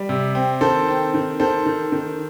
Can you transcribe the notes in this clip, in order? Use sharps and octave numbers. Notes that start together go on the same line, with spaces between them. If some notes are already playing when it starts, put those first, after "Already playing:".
Already playing: G3
C3
C4
D#3 A4 C5
C4
D#3
D#3 A4 C5
D#3
D#3